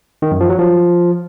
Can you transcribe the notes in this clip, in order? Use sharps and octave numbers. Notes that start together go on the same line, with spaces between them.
D#3
F#2
F3
F#3
F3